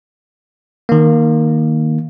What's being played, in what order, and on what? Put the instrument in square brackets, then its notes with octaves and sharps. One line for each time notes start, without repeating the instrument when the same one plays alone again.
[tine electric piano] D#3 A#3